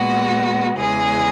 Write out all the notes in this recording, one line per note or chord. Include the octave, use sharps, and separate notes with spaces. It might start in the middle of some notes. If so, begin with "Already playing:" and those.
Already playing: A#2 G#3 B3 F#4
E2 C#3 E3 G#3 G#4